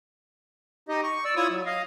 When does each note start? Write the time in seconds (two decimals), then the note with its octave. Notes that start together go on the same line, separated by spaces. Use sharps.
0.89 D#4 G4 D#5
1.03 C#6
1.25 D5 E6
1.36 E4 F4 C#5 C#6 D#6
1.50 F#3
1.66 D#5 F5